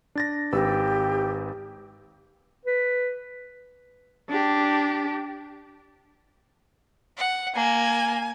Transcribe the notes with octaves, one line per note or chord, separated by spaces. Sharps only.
D4 A6 A#6
G#1 G4 B4 E6
B4
D4 G4
F#5
A#3 G#5